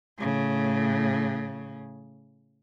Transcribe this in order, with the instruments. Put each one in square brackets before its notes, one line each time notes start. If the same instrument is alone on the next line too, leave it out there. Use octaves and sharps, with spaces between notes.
[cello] A2 C#3